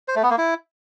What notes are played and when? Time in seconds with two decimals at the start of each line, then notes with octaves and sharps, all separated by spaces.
0.08 C5
0.16 A3
0.23 B3
0.31 A#3
0.38 E4